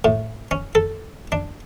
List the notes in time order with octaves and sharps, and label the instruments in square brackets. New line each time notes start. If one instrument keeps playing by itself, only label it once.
[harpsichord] A2
C#4
A4
D4